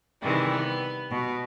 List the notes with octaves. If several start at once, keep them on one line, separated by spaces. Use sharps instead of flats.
C3 D#3 E3 G3 G#3
B3
B2